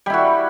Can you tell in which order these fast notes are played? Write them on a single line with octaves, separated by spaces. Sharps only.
G3 E4 F#4